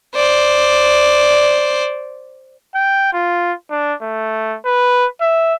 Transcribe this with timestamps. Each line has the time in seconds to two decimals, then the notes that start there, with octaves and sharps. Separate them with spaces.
0.15 C5 D5
2.75 G5
3.13 F4
3.70 D4
4.02 A3
4.65 B4
5.21 E5